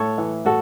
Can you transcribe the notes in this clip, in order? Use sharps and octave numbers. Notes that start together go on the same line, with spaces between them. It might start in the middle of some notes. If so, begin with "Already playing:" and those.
Already playing: A2 A4 C#5
E3
A2 F#4 A4